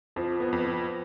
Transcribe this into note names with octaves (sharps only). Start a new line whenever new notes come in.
F2 F3
B3
F2
F3